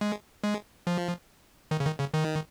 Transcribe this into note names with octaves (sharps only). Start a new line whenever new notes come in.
G#3
G#3
F3
D#3
C#3
D#3
C#3
D#3